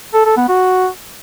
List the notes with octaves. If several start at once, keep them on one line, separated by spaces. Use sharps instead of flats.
A4
A4
B3
F#4